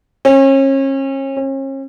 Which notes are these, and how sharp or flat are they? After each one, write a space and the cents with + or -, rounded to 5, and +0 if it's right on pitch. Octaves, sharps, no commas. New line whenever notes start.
C#4 -35
C#4 -40